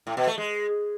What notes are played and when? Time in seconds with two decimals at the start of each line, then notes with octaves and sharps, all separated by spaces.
0.07 A2
0.17 B2
0.27 A3
0.38 G#3